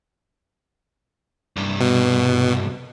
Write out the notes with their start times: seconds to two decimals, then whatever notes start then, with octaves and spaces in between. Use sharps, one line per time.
1.57 C2 G2
1.81 B2